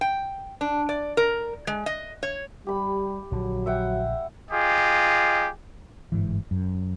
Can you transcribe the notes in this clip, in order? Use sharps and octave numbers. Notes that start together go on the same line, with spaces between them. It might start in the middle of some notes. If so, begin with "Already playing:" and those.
G5
D4
D5
A#4
G#3
D#5
C#5
G3 G4 B5
A#1 D3 F#3
E5 F#5 G5
F4 G4 G#4 D#5
G1 G#2 E3
F#2